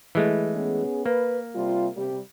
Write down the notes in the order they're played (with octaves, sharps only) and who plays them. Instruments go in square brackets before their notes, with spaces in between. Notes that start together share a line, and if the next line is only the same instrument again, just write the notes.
[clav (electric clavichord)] E3 G#3 A3
[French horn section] B3 C#4 G#4
[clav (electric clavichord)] A#3 [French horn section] B4
[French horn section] C3 G3 F4
C3 G3